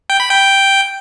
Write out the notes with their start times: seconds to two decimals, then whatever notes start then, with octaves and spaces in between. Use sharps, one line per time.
0.10 G5
0.20 B5
0.30 G5